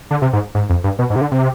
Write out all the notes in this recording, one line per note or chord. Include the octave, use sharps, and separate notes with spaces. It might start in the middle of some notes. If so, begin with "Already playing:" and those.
D3
C3
G#2
G#2
F2
G2
B2
G#2
C3
D3
C3